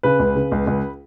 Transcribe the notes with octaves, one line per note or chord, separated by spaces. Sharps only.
C#3 B4
C#2
C#3
C#2
C#2